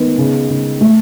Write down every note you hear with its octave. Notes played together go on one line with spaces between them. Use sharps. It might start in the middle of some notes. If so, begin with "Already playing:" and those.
Already playing: D#3 B3
C#3
C#3
A3